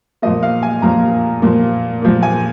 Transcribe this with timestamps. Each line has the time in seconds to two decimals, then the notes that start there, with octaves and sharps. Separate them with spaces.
0.22 A#2 F3 A#3 D#5
0.43 F5
0.63 G#5
0.82 A#2 F3 A#3 A#5
1.42 A#2 F3 A#3
2.02 A#2 F3 A#3
2.23 G#5